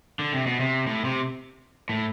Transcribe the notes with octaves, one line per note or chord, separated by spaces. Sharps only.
D3
C3
B2
C3
A2
C3
A2